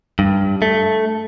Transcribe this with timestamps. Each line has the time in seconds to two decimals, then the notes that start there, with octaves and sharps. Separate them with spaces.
0.19 G2
0.62 A3